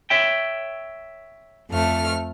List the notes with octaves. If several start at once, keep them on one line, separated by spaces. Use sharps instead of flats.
C#5 E5 G5
F2 A3 F6